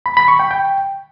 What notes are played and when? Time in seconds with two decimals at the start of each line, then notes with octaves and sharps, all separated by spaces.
0.06 B5
0.17 B5
0.28 C#6
0.39 G5
0.51 G5